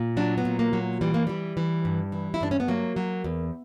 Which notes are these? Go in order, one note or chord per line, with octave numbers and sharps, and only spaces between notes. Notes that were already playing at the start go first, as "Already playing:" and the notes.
Already playing: A#2
F#3 D4
B3
A#2
A#3
F#3
E3 G3
A#3
E3 G3
E3
G2
E3
E4
G2 D4
C#4
B3
F#3 A#3
F#3
E2